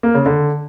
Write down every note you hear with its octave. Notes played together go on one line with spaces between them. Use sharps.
A#3
C#3
D3